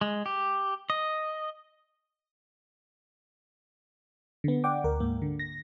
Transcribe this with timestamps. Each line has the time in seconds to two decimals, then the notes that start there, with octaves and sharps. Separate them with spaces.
0.01 G#3
0.26 G4
0.90 D#5
4.44 D3 B3
4.64 D5 F#5 G5 D6
4.84 D2 A#4
5.00 G#2 A#3
5.22 D3
5.39 A#6